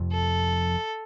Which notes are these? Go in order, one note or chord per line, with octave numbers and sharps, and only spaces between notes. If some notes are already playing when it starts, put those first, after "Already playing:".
Already playing: F1 F2 C3 F3
A4